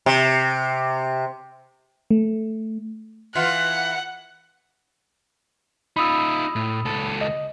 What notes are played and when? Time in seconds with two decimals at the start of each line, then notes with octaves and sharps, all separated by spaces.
0.06 C3
2.11 A3
3.35 E3 F4 F#5
5.96 D#4 F4 B5 D#6 E6
6.56 A2
6.85 C#2 A4
7.21 D#5